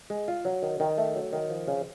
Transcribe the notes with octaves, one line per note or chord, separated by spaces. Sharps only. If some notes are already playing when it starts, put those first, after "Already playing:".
G#3
F4
F#3
D#3
D#3
A3
F#3
D#3
F3
C#3